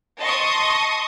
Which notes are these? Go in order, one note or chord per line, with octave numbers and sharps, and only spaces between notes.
D#5 A5 C6 C#6 D#6